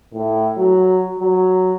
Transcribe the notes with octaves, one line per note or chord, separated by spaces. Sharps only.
A2
F#3
F#3